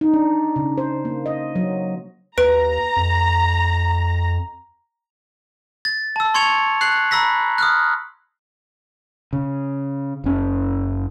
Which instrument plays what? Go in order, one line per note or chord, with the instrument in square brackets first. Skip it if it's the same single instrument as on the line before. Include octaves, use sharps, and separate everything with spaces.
[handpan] D#4
D4
C#3
C5
A#3
D#5
F#3
[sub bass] D#2 [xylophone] B4 D7 [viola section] A#5
[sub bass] F2
[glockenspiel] A6
A5 E6
C6 C#6 G#6 C#7 F7
F#6 C7 F#7
A#5 B5 E6 A#6 B6
D#6 F6 F#6
[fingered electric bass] C#3
F#1 C#4